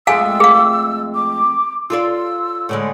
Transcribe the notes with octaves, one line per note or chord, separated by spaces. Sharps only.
F2 G#3 A3 F5 G#5 E6
G#4 F5
D6
F4 A4 D5 E6
A2 D3 G#3